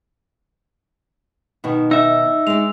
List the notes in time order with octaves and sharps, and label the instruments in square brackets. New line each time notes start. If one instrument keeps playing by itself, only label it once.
[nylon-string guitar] B2 D#3
[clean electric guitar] D#4 E5 [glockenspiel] E6
[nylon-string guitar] G#3 D5 [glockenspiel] F7